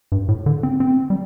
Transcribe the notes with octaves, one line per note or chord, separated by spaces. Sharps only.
G2
A2
D3
C4
C4
G3